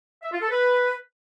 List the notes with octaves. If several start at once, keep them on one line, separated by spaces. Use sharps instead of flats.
E5
F4
A4
B4